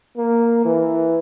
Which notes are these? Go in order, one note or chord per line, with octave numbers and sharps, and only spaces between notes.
A#3
E3